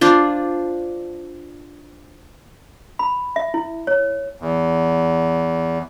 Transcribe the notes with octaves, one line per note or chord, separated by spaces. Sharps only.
D4 F4 C5
B5
E5
E4
C#5
E2